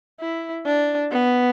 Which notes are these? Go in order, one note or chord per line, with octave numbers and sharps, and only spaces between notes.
E4
D4
B3